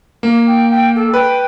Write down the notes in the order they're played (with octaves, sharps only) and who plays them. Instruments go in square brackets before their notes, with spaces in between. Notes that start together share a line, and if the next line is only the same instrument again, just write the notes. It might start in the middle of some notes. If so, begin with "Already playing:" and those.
[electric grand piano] A#3
[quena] G5
G5
A4
[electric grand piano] B4 [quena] G5